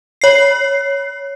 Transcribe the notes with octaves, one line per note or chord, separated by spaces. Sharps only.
C#5 C7